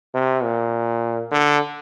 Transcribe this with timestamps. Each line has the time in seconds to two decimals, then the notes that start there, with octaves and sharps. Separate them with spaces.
0.14 C3
0.43 A#2
1.32 D3